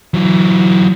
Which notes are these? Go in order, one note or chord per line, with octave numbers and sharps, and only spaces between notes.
E3 F#3